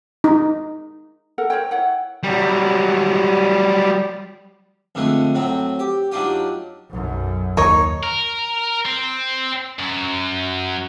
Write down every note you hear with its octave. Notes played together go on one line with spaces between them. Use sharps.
D#4
A4 A#4 F#5
A#4 C5 C#5 G5
E4 C#5 F#5 G5
F#3 G3
F2 D3 F3 G#3 A3
A2 F#3 C4
G4
F#3 D4 D#4 F4 G4
B1 F#2
D#2 D#4 A#4 C#5 D#5
A#4
C4
F#2